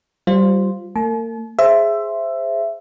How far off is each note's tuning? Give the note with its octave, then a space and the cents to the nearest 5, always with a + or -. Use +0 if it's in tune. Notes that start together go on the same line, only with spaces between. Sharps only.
G3 -20 F4 +0 C5 +0
A#3 -40 A5 -45
G#4 +0 C5 +0 E5 +15